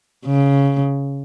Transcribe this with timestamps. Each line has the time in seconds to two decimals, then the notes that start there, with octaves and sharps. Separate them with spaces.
0.26 C#3